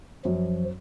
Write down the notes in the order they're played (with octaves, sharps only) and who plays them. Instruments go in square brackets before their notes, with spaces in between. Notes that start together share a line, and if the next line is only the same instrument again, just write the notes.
[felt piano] F#2 [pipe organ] F3